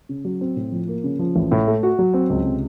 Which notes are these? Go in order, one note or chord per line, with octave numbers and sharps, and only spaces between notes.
C#3
F#3
C4
A2
F3
A#3
C#3
F3
A1
A2
A3
F#4
F#3
C4
C#2
C3